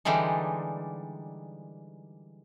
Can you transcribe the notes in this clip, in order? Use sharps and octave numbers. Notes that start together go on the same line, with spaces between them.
D3 E3 G3 G#3 D#4